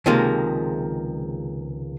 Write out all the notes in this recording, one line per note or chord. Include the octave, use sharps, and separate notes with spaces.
C#2 C3 D#3 F3 G#3 A#3